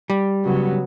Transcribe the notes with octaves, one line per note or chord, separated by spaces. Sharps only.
G3
C#3 F#3 B3